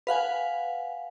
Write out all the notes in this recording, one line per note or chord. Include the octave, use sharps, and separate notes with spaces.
B4 F5 F#5 G#5